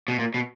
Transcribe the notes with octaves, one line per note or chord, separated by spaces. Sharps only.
B2
A#2
B2